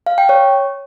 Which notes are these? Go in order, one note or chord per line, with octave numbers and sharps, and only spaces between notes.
F5
G5
C#5